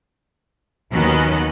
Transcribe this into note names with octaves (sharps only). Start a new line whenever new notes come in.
D#2 D#3 F#3 B3 C#4 F#6